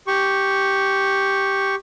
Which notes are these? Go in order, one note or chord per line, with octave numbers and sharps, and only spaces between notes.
G4 C#6